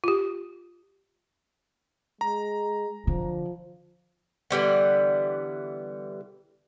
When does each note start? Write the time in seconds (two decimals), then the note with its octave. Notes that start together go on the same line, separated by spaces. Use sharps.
0.04 F4 G4
2.21 G#3 A#5
3.07 D3 F3
4.51 D3 E3 G3 B3